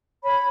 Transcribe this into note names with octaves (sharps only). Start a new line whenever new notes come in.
C#5 B5